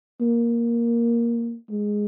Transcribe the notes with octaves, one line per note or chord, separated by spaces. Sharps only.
A#3
G#3